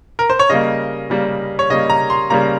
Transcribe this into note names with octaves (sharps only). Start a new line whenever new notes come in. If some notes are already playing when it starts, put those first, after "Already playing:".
A#4
C5
C#5
C#3 G3 A#3 D#5
C#3 G3 A#3
C#5
C#3 G3 A#3 D#5
A#5
C6
C#3 G3 A#3 A#5